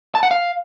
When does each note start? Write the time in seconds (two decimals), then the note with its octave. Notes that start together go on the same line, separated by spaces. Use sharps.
0.15 A5
0.23 F#5
0.31 F5